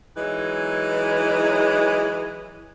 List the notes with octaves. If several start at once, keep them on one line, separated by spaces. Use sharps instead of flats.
E3 F#3 G#3 D#4